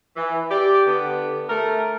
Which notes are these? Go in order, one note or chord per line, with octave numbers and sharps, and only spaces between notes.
E3
G4 D5
D3 B3
A3 A#4